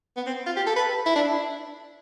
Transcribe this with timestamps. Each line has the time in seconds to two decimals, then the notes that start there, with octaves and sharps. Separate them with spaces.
0.17 B3
0.27 C4
0.46 F4
0.56 G4
0.67 A4
0.76 B4
1.06 E4
1.16 D4